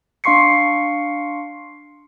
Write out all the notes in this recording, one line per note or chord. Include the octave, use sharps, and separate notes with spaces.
D4 F5 C6 C#6 C7 C#7